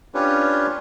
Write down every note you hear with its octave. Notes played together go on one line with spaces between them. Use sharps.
C#4 D4 F4 G4 B4 C#5